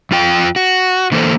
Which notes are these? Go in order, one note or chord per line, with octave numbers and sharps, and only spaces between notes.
F2 F4 G5
F#4
D3 E3 A#3 A4 C5